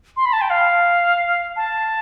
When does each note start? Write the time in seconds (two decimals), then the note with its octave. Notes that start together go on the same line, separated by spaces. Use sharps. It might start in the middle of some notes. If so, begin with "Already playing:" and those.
0.17 C6
0.25 B5
0.33 A5
0.41 G5
0.50 F5
1.56 A5